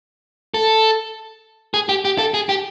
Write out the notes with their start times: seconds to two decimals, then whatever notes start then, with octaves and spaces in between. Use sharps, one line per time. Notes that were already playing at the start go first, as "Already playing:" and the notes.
0.54 A4
1.74 G#4
1.89 G4
2.05 G4
2.18 A4
2.34 G#4
2.49 G4